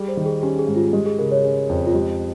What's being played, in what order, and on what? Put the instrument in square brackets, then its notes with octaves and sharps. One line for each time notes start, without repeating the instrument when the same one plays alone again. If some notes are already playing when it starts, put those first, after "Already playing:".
Already playing: [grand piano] G3 [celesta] G#4
[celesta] C5
[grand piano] D#3
[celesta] G#4
[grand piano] C#4 [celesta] G4
[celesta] G#4
[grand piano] G#2
[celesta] F4
[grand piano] G#3 [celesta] G4
[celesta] G#4
[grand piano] C#3 [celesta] A#4
[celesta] C#5
[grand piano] C#4 [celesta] G#4
[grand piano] F2
[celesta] F4
[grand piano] G#3 [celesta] G4